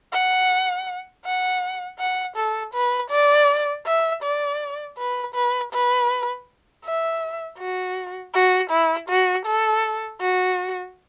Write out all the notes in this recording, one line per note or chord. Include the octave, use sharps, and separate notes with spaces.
F#5
F#5
F#5
A4
B4
D5
E5
D5
B4
B4
B4
E5
F#4
F#4
E4
F#4
A4
F#4